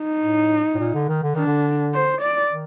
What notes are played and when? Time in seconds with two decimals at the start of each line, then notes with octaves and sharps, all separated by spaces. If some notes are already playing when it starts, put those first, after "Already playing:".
Already playing: D#4
0.22 A2
0.75 A2
0.79 A#2
0.94 D3
1.08 D#3
1.23 D3
1.34 D#3 D4
1.47 D3
1.94 C5
2.22 D5
2.51 D#3